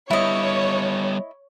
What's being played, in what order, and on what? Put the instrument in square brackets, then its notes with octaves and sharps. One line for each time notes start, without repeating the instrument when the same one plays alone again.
[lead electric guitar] G3 B3 [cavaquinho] E4 D#5 [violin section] C#5